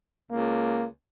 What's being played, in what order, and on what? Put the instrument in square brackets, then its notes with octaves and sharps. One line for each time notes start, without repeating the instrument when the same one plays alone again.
[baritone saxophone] C#2 [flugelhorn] A#3